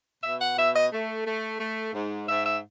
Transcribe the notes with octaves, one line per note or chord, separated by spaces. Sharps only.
B2 E5
F#5
B2 E5
D#5
A3
A3
A3
G#2
G#2 E5
E5